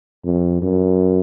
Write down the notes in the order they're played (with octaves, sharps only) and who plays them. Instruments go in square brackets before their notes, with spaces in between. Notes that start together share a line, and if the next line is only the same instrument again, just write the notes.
[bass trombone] F2
F#2